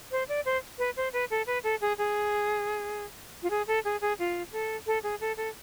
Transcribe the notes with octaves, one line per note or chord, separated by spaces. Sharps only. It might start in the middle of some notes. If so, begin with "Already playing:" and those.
C5
D5
C5
B4
C5
B4
A4
B4
A4
G#4
G#4
F4
G#4
A4
G#4
G#4
F4
A4
A4
G#4
A4
A4